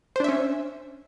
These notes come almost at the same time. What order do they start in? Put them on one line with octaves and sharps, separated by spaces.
C5 D4 E5 C#4